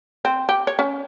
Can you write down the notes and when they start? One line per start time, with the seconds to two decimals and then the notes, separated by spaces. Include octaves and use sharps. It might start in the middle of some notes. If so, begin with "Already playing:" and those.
0.25 C4
0.49 G4
0.67 C#5
0.79 C#4